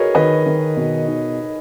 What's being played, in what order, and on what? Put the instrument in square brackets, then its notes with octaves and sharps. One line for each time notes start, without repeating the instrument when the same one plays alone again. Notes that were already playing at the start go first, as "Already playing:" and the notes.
Already playing: [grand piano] F#4 [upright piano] G#4 A#4 B4 C#5 D#5
[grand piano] D#3 [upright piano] B4 D#5
[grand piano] D#3
B2
D#4